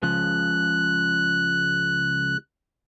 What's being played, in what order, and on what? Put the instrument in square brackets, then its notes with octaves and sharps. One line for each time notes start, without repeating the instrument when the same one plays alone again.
[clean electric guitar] C#2 C#3 F3 [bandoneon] F#6